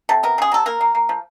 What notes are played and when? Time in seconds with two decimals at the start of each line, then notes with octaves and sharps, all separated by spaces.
0.09 C3 A4
0.23 B3 A#4
0.38 C#3 G#4
0.52 F#3 A4
0.66 A#3 A#4
0.81 A#3
0.95 A#3
1.09 F3